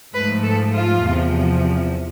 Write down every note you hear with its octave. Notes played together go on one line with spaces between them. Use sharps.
G#2 F3 A3 B4
A4
F4
E2 C3 F3